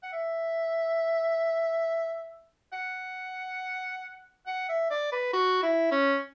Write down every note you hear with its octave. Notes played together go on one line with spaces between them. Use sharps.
F#5
E5
F#5
F#5
E5
D5
B4
F#4
E4
C#4